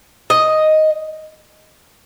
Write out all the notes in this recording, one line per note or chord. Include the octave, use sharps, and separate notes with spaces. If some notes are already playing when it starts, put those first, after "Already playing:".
D#5